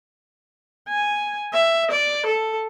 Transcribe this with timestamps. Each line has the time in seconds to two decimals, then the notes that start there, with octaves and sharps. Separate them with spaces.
0.89 G#5
1.53 E5
1.91 D5
2.26 A4